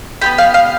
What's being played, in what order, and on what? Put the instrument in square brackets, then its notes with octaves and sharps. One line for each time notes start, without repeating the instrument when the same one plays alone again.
[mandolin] B3 E4 G4 B5
F5
F5